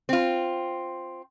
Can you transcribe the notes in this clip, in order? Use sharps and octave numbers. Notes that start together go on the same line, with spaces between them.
C4 F4